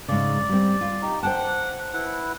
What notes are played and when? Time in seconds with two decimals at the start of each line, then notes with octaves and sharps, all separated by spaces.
0.08 G#2 C#3 D5
0.49 G3 C4
0.81 F4
1.02 D#4 G4
1.23 C5 F#5 G5 A5
1.94 E4 B4 F#5